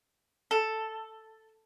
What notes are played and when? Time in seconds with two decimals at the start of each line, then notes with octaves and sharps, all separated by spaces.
0.51 A4